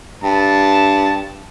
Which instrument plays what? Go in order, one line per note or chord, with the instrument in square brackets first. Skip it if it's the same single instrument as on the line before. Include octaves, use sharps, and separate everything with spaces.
[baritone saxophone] G2 [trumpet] A5